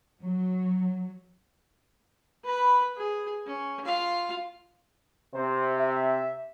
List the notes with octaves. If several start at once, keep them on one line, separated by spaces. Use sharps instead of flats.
F#3
B4 B5
G#4
C#4
F4 F5
C3 C5
E5